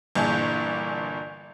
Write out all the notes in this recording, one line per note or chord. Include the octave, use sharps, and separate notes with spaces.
G1 A#2 E3 D4 G#4 G6